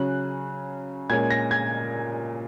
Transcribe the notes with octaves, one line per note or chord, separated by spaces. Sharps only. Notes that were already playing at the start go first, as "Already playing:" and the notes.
Already playing: C#3 F#3 C#4 F#6
A#2 G#3 C#4 G#6
A#6
G#6